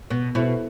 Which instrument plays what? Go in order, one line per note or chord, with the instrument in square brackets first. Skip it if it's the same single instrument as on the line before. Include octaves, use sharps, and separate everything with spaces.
[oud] B2 [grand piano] B3
[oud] B2 [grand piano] E4 A4 C5 E5